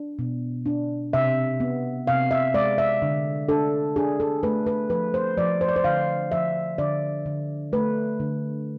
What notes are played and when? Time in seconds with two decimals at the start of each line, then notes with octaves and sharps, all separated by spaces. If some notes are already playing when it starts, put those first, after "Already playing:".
Already playing: D4
0.19 B2
0.66 D4
1.13 C3 E5
1.60 B3
2.07 C3 F5
2.31 E5
2.54 G#3 D5
2.78 E5
3.02 D3
3.49 D4 A4
3.96 D4 G#4
4.20 A4
4.43 A3 B4
4.67 B4
4.90 F3 B4
5.14 C5
5.37 F3 D5
5.61 C5
5.69 D5
5.76 C5
5.84 D3 F5
6.32 F3 E5
6.78 D3 D5
7.26 D3
7.73 A3 B4
8.20 D3